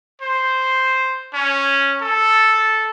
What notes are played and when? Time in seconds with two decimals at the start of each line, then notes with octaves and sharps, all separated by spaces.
0.22 C5
1.34 C#4
2.02 A4